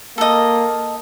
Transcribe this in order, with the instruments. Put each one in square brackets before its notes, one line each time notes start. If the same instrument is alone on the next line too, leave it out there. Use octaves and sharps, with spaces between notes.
[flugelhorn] A#3 [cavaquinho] A4 D#5